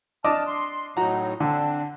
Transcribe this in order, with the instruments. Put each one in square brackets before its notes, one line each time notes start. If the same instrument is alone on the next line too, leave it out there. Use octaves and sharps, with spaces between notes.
[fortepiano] D4 D#5 D6 [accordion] A5 F6
[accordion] C6
[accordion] A2 F#3 D#4 [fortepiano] F#4 A#5
[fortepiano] D3 [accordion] C4 D4